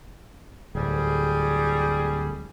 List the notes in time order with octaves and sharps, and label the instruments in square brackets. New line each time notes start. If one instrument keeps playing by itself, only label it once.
[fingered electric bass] D1 [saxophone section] G3 G#4